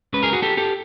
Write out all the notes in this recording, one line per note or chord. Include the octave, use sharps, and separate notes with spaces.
C#2 C#3 B4
G#4 A#4
F#4 G#4
G4 A4
G4 A4